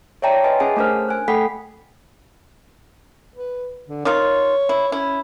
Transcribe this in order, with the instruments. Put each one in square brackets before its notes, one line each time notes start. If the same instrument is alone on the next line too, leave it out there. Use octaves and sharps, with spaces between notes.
[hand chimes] C#5 D5 E5 G5 A5 A#5
B4 D#5 E5 G#5 C6
C#4 G#4 F#5 G#5 A5
A3 C#4 D4 A#4 C5 F6
G#5 F#6
A3 A4 F#5 G5 B5 B6
[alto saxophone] B4
D3
[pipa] D#3 D#4 F4 [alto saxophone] C#5
[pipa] E4
[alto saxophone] C#4 [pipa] E4